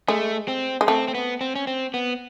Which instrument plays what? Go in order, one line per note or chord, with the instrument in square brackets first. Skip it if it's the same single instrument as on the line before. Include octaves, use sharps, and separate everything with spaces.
[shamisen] G#3 [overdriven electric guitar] A3
[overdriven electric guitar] C4
[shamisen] G#3
[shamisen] A3 [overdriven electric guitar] C4
[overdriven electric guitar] C4
B3
C4
C#4
C4
B3